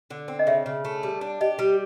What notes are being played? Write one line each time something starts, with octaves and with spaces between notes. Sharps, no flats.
D3
C4
D#5
C#3 E5
C#3
A3
G3
D4
G4 D#5
G3